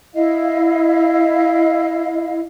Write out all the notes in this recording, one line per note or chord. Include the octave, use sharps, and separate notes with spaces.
E4 D#5 F5